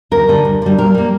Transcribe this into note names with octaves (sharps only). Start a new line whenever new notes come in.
D2 A#4
D3 G3
D2
D3 G3
A#2 A#4
G3 A#3